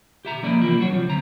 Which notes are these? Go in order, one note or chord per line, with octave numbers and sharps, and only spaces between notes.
G4 E5 A#5
F3 A#3 C#4 E4 D5 D#5
C3 E3 F3 A#3 E4 F4
F#3 D4 F#4 C#5
F#2 C3 F3 G3
D2 C4 A#5